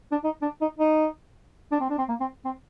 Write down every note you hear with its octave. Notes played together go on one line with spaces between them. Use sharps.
D4
D#4
D4
D#4
D#4
D4
C4
D4
C4
A#3
C4
C4